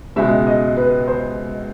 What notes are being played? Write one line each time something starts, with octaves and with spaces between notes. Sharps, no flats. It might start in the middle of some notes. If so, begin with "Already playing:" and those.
C#2 B2 G#3 E5
D#5
B4
C5